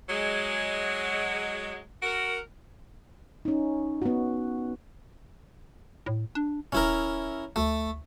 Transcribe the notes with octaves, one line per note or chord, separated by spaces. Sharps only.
F#3 G#3
F#4 A#4
C#4 D#4
B3 F#4
A2
D4
D#1 C#4 E4 A#4
D2 A3